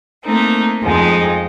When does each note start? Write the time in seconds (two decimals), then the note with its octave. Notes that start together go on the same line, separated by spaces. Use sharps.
0.24 A3 A#3 C4 D#4
0.80 F2 G#3 D#4